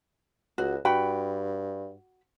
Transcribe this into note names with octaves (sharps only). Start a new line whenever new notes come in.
C#2 F#4
G2 F#4 G5 B5